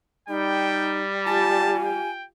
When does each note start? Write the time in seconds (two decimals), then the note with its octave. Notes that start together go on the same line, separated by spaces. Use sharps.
0.28 G3 D#4 G5
1.26 F4 G4 G#5 A5
1.86 G5